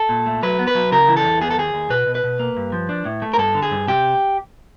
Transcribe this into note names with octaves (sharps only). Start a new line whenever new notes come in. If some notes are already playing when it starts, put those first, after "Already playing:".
Already playing: A4
A#2
A3
F#3 B4
B3
B4
F#3
C#3 A#4
E3
A4
E2
B3 G#4
A4
D#2 G#4
D#2
B2 B4
B2
B4
B2
A#3
G2
F3
D4
A2
A3
A#4
G2 A4
D3
G#4
G2
C3 G4